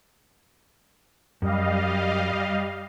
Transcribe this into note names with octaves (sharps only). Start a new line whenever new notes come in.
F#2 G3 D#5 F5